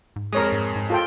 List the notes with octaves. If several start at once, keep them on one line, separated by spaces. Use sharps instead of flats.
G#2
F2 G#3 A#4 C#5 D#6
G#2
G#2
F4 A4 G5